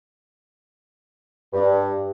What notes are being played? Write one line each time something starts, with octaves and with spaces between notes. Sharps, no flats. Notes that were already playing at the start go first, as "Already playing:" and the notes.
G2